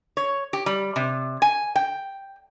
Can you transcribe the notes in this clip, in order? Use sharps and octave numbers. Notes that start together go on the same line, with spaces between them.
C#5
G4
G3
C3
G#5
G5